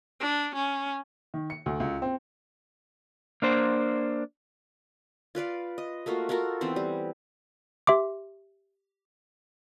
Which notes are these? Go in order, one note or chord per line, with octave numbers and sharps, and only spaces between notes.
D4
C#4
D#3
C#7
D2
C#2
C4
A#3 D4 C5
F4 B4 D5 F5
D#5
A3 A#3 F4 F#4
F4 F#4 A4 A#4
E3 B3 C4 C5
G3
G4 E5 C6 D6